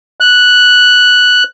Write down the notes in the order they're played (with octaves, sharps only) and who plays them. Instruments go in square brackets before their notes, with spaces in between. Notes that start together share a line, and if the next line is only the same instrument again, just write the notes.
[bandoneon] F#6